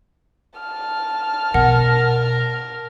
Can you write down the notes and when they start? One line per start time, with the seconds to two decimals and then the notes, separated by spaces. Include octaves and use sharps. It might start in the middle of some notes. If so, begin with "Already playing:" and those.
0.59 A5 F6
1.54 B2 A#4 F#5